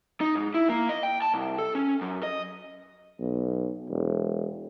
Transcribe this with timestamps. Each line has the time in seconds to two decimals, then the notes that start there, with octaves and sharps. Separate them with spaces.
0.21 D#4
0.35 G#2
0.54 E4
0.69 A#3
0.89 D#5
1.03 G5
1.22 A5
1.34 C2
1.58 A4
1.75 C#4
2.01 F#2
2.23 D#5
3.20 B1
3.90 E1